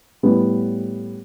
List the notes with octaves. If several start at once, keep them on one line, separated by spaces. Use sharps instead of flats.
A2 G3 B3